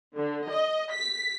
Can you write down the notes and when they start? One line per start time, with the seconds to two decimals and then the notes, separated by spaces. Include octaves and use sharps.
0.16 D3
0.49 D#5
0.93 B6